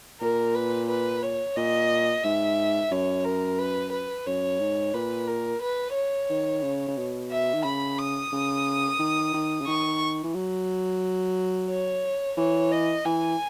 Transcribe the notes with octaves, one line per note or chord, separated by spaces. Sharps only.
A#2 A#4
B4
B4
C#5
A#2 D#5
G#2 E5
F#2 C#5
A#4
B4
B4
F#2 C#5
G#2
A#2 B4
A#4
B4
C#5
D#3
C#3
C#3
B2
E5
D#3
C#3 B5
D#6
C#3
D#3
D#3
C#3
D#3 C#6
E3
F#3
C#5
E3 C#5
D#5
E3 G#5